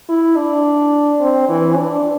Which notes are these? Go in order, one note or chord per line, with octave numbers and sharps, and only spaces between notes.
E4
D4
C4
E3
D4